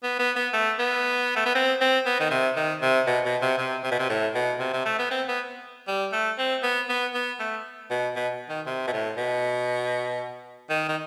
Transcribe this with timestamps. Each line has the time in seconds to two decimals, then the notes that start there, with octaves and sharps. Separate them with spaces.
0.03 B3
0.19 B3
0.36 B3
0.54 A3
0.79 B3
1.36 A3
1.46 B3
1.55 C4
1.81 C4
2.06 B3
2.20 D#3
2.31 C3
2.56 D#3
2.82 C3
3.07 B2
3.25 B2
3.42 C3
3.58 C3
3.84 C3
3.91 B2
3.99 C3
4.10 A2
4.35 B2
4.60 C3
4.73 C3
4.86 A3
4.99 B3
5.11 C4
5.29 B3
5.88 G3
6.13 A3
6.38 C4
6.63 B3
6.89 B3
7.15 B3
7.40 A3
7.91 B2
8.16 B2
8.49 D#3
8.67 C3
8.88 B2
8.93 A2
9.17 B2
10.70 D#3
10.89 D#3